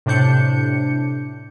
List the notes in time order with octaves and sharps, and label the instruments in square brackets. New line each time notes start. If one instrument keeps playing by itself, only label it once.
[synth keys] A2 C3 D4 G6 C#7